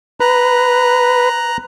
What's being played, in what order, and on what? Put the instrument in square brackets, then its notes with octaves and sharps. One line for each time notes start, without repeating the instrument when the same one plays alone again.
[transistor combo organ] B4 [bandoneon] A#5 F#6